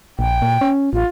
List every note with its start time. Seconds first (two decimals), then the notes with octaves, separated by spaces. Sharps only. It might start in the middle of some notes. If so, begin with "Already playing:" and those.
0.19 A#1 G5
0.42 A#2
0.61 C#4
0.93 A1 F4